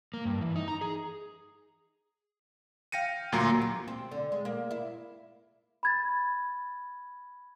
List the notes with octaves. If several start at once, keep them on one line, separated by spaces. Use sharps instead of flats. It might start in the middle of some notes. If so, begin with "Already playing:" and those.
A#3
G2
E3
D#4
A#5
G#4
F5 G5 A#6 C#7 D#7
D2 A#2 F#3 A#3 A#5 C6
G4
C4
D3
G#3
A#3
E4
B5 G#6 A6